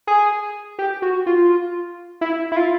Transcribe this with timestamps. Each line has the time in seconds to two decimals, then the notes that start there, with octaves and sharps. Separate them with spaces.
0.07 G#4
0.79 G4
1.02 F#4
1.26 F4
2.21 E4
2.52 E4
2.56 F4